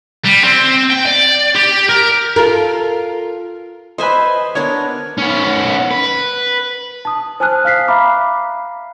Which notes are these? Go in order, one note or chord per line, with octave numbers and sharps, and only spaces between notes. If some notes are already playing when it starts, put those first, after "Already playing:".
G3
C4
G5
D5
G4
A#4
F4 A4 A#4
B4 C5 D#5 E5 G#5
B3 D4 A#4 C#5
B3 C#4
B4
A5 D#6
C5 G#5 A5 D#6 F6 F#6
F5 F6 B6 C7
E5 F5 A#5 B5 D6